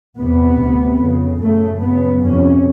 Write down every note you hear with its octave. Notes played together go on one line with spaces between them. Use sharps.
E2 C3 B3
D2 C3
F2 C#3
F#2 C#3 A3
F#2 C#3 B3
F2 C3 C#4